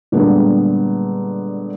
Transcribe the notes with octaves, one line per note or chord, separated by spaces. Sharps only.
A#2 D3 G3 G#3 B3